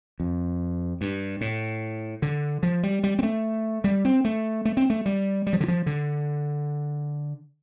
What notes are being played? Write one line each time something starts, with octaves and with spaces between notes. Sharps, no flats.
F2
G2
A2
D3
F3
G3
G3
C4
A3
G3
C4
A3
A3
C4
A3
G3
G3
F3
D3
F3
D3